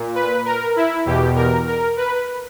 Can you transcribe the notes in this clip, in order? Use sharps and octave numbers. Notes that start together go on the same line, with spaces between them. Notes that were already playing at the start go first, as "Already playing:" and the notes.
Already playing: A#2
B4
A#4
E4
E2 B2 G4
A#4
A#4
B4